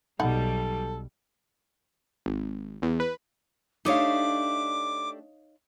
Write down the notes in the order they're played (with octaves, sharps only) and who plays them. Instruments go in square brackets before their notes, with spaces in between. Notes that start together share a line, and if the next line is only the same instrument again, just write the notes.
[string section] B1 G3 [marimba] B2 [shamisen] D#4 F#5 [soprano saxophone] A4
[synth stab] G#1
E2
B4
[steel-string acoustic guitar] A3 D4 G4 [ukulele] D#4 C#5 F5 [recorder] D6